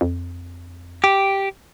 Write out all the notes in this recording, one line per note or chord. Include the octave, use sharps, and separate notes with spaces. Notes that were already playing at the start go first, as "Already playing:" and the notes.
F2
G4